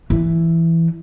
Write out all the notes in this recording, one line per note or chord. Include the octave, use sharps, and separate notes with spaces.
E3